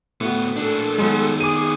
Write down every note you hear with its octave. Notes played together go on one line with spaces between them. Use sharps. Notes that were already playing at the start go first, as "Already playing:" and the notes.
D2 A2 B3 F#4
A#2 D4 A4
D#3 F#3 G#3 B3
G#4 D6 D#7